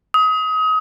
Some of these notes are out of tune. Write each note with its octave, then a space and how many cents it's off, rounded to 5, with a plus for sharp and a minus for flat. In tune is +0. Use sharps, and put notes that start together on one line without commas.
D#6 +30